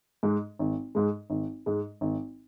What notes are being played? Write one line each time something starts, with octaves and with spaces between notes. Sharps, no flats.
G#2 G#3
G#1
G#2 G#3
G#1
G#2 G#3
G#1